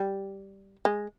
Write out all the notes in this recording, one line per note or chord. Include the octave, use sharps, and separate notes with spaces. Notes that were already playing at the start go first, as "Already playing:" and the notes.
Already playing: G3
G#3